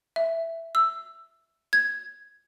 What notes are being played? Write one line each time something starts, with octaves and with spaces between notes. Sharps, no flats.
E5
E6
G#6